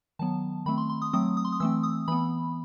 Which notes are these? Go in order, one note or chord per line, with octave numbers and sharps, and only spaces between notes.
D#3 F#3 B3 A5
D#3 A3 C4 B5
C6
C6
D#6
F#3 A3 C4 D#6
D#6
C6
D#6
E3 A3 C4 E6
D#6
E3 B3 B5